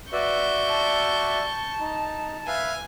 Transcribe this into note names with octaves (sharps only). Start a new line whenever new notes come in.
F#4 B4 D5 E5 C#6 G6
A5
D#4
B4 E5 F5 G#5